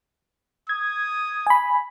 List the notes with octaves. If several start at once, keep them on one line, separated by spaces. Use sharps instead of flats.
D#6 G#6
G#5 B5